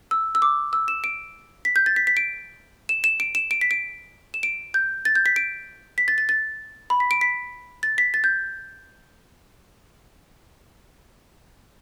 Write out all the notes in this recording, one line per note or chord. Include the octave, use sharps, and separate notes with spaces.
E6
E6
D6
E6
E7
D7
B6
G6
A6
B6
B6
D7
E7
E7
D7
E7
D7
B6
D7
E7
D7
G6
A6
G6
B6
D7
B6
A6
A6
A6
B5
B6
D7
B6
A6
B6
A6
G6